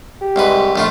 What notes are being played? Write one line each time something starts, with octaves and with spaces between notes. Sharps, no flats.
G4
C2 G#2 B4
A#1 A3 F4